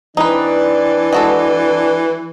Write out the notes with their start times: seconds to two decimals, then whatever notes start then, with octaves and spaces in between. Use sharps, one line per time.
0.17 E3 C4 D4 D#4 B4 D5
1.13 G#3 F#4 A4